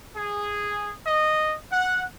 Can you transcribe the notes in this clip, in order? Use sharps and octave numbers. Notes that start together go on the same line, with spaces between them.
G#4
D#5
F#5